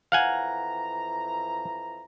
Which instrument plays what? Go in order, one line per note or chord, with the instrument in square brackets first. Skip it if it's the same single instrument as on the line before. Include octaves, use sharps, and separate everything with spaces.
[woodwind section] F2 E3 A#5 [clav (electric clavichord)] F5 F#5 G#5